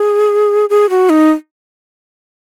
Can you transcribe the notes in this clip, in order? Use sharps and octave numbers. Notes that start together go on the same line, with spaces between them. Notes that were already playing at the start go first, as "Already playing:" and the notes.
Already playing: G#4
G#4
F#4
D#4